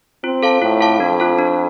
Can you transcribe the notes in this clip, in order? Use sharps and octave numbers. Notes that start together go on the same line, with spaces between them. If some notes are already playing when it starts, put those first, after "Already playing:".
C4 F4
A4 F5 A5
A2 F4
A4 F5 A5
F2 D4
F4 A4
D4